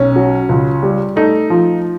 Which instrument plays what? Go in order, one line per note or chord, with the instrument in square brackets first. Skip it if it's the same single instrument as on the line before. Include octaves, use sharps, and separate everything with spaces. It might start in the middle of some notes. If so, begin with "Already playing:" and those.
Already playing: [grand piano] B1 C#4
F#3
C#2
G3
A3 D#4
F3